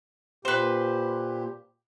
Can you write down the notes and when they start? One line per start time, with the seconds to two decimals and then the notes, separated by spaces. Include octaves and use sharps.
0.45 A#2 G4 B4 C5